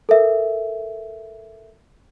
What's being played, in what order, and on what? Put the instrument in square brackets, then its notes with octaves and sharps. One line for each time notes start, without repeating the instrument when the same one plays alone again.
[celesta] A4 A#4 E5